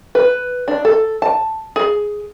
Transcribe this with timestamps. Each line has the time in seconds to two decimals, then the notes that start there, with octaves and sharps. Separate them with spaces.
0.15 B4
0.68 D4
0.85 A4
1.22 A5
1.76 G#4